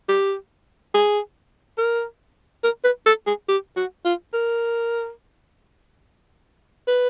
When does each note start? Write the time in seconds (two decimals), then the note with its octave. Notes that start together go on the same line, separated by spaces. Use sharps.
0.09 G4
0.94 G#4
1.78 A#4
2.63 A#4
2.84 B4
3.06 A4
3.27 G#4
3.48 G4
3.76 F#4
4.05 F4
4.34 A#4
6.88 B4